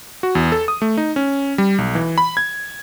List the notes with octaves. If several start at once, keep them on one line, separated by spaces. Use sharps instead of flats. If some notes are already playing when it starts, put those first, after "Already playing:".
F#4
E2
A4
D#6
A3
D#4
C#4
G3
B1
E3
B5
G#6